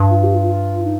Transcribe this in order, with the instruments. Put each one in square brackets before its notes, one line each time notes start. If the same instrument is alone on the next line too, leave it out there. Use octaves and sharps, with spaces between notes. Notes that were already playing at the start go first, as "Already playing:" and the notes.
Already playing: [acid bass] G2
[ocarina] F4
G4
F4
F4
D#4